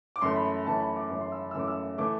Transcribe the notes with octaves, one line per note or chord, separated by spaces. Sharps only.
D6
F#2 E3 A3 C6
B5
F#2 E3 A3 A5
B5
D6
F#2 E3 A3 D6
C6
E6
E6
F#2 E3 A3 D6
E6
E3 A3 D6